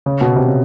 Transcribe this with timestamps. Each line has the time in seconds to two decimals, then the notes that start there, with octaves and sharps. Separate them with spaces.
0.06 C#3
0.21 B2
0.36 C3
0.47 C#3